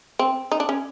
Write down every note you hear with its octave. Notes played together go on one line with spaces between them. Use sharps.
C4
D#4
D4
C#4